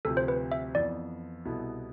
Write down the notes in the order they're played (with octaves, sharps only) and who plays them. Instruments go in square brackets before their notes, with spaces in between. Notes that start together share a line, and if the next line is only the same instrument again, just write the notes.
[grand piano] D2 C3 F3 [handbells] A4
[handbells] C5
B4
E5
[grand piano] F2 E3 B3 [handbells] D5
[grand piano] C2 B2 B3 E4 A4